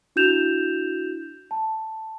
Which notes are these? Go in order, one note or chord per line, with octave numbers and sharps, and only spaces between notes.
D4 E4 F#4 G6 E7 F7
A5